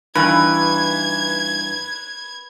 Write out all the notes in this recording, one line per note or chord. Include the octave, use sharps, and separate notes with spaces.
G2 E3 D#4 B4 G#5 G#6